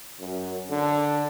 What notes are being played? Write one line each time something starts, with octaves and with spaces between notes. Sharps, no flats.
F#2
D3